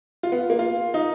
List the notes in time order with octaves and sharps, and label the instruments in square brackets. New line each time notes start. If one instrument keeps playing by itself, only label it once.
[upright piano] F4
B3
A#3
F4
D#4